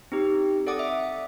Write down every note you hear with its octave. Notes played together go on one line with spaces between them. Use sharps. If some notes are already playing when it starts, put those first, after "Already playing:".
C4 D#4 G4
A4 D5 F#5 D6 D#6
E5